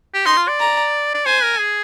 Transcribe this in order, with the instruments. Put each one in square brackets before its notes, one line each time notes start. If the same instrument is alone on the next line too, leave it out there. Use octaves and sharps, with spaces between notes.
[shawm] G4
[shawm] D#4 [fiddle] C6
[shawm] F4
D5
[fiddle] A#5
[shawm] D5
[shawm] C5 [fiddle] G#5
[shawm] A#4
G#4